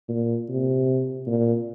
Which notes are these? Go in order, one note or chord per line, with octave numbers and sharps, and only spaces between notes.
A#2
C3
A#2